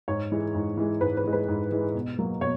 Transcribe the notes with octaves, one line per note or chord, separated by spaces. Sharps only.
G#2 C#5
E3 G#3
G#2
E3 G#3
G#2 B4
B4
E3 G#3
B4
G#2
E3 G#3
B2
F#3 A#3
B2 C#5